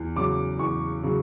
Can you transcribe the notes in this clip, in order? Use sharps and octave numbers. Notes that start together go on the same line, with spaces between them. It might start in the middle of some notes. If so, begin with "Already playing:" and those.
Already playing: E2
C#3 F#3 D6
E2 C#6
C#3 F#3